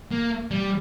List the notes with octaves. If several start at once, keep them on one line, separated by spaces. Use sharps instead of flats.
A#3
G3